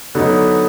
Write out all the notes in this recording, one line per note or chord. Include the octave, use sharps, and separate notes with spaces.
D3 F#3 B3 D#4